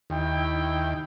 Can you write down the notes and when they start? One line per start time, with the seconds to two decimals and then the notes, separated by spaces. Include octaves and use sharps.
0.10 D#2 E4 G5